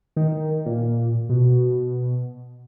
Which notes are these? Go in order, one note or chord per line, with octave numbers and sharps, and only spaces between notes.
D#3
A#2
B2